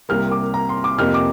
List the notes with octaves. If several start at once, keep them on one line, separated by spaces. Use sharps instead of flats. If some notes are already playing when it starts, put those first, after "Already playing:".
C2 C3 G3 A#3 F6
D6
A#5
C6
D6
F2 C3 A#3 F6
D6